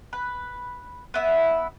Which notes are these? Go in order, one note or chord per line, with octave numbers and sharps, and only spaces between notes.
B4
B3 E4 E5